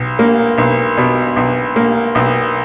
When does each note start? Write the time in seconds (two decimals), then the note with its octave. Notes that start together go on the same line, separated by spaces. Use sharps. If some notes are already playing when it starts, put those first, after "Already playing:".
Already playing: B1
0.19 A#3
0.58 B1
0.98 B2
1.36 B1
1.76 A#3
2.15 B1